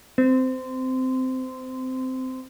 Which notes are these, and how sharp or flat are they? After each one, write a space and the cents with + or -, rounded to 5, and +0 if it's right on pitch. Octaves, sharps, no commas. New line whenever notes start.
C4 -20